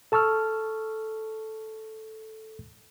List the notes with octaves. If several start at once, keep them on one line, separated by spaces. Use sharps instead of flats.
A4 A5 C#6 E6 F6